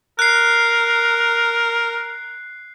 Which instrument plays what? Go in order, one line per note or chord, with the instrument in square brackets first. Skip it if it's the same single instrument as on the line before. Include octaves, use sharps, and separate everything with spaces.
[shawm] A#4 [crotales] F#6 C7